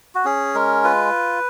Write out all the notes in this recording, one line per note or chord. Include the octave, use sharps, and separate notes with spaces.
F#4
C#4 G#4
G#3 A#4
F4 B4